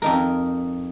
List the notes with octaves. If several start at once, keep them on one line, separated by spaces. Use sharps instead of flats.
F2 D#4 A#4